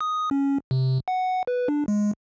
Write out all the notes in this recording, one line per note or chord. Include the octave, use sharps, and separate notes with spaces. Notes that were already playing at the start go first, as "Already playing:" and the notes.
D#6
C#4
C3
F#5
B4
D4
G#3